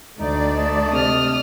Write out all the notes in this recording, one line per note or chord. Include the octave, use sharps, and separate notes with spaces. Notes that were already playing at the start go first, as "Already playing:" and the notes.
D2 A3 D#4 D5
D#5 A5
C3 D#6 F6